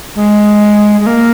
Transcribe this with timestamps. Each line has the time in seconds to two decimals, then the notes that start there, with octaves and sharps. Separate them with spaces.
0.15 G#3
1.00 G#3
1.06 A#3